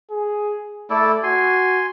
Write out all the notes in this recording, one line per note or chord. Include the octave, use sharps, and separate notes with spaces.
G#4
A3 E4 A4 D5
F#4 G#5 C6